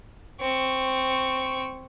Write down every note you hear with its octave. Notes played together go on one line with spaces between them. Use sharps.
C4 C#6